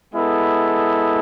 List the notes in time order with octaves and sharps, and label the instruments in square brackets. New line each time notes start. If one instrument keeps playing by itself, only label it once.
[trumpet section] G#3 B3 E4 A4